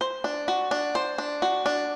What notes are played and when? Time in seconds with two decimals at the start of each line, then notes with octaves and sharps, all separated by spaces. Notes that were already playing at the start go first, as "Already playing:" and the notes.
0.01 C5
0.24 D4
0.48 F#4
0.71 D4
0.95 C5
1.18 D4
1.42 F#4
1.66 D4